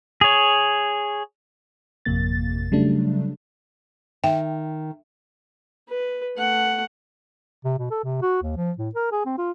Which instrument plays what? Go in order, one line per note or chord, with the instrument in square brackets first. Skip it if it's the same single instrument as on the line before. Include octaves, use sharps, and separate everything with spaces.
[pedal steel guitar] G#4 C#5
[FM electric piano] G#1 F2 C3 A#3 A6
C#3 F#3 G3 A3 D4
[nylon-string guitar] D#3 [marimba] E5 [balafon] G5
[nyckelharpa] B4
A3 F#5
[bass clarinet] C3
B2
A4
C3
F#4
D#2
F3
A2
A#4
G#4
C4
F4